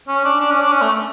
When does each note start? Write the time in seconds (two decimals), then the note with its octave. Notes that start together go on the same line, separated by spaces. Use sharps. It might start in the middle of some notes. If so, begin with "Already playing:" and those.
0.08 C#4
0.25 D4
0.40 D4
0.51 C#4
0.61 D4
0.72 C#4
0.82 A3